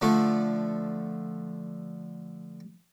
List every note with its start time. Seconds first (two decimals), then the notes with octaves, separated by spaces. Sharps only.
0.01 D3 F3 A3